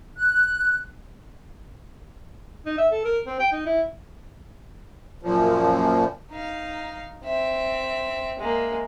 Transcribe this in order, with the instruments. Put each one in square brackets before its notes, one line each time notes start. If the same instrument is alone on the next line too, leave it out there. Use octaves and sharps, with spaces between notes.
[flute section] F#6
[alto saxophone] D#4
E5
A4
A#4
C4
G5
D#4
E4
[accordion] F#2 A#2 F3
[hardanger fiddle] D#4 F5
C4 E5
G#3 A#3